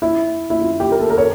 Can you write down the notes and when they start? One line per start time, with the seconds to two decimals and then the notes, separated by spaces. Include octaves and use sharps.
0.02 E4
0.50 E4
0.61 F4
0.80 G4
0.92 A#4
1.00 A4
1.10 A#4
1.18 C#5